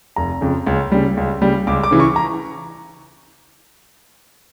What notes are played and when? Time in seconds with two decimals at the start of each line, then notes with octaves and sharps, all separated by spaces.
0.16 F1 A#5
0.41 F2 C#3
0.67 C#2
0.92 C#3 G3
1.17 C#2
1.42 C#3 G3
1.67 C#2 D6
1.84 D6
1.91 C#3 E3
2.00 C#6
2.16 A#5